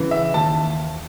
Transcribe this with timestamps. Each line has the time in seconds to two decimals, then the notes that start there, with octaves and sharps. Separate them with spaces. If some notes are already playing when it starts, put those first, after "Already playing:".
Already playing: C#3 E3
0.11 E5
0.34 D#2 A5